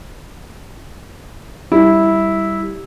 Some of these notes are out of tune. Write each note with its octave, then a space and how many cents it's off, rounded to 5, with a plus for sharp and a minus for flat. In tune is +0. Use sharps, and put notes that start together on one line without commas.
G3 +0 E4 -10